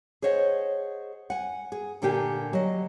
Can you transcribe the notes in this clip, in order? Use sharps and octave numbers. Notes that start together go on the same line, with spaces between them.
G#4 C5 C#5 D#5 F#5
F#5 G#5
G#4
A#2 D3 A#3 G4 G#5
F#3 D#5